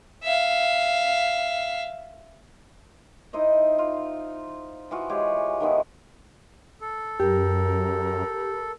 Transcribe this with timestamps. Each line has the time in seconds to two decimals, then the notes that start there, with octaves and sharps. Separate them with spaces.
0.23 E5 F5
3.33 D#4 E4 C5 D#5
3.78 F4
4.91 E3 F3 F4 F#4
5.09 G#3 G4 G#4 C#5
5.60 D#3 F3 B3 E4
6.81 A4
7.20 F#2 G4 A#4